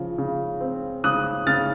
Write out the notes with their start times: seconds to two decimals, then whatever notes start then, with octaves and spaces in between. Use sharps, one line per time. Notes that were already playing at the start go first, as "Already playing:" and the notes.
Already playing: C#3 F3
0.18 C#3
0.61 C4
1.04 C#3 D#6 F#6
1.47 C#3 F6 A6